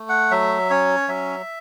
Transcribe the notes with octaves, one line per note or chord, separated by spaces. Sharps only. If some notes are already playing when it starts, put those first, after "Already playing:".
Already playing: A3
F#5
F#3 E5
C#4 C#5
F#3 E5